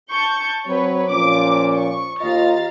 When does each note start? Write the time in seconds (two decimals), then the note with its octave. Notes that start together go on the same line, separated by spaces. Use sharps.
0.11 A5 C#6 G6
0.67 F#3 C4 B4 C#5
1.10 A#2 F3 C#4 D6
1.75 C#6
2.21 D#2 F4 D#5 F5 A#5 A6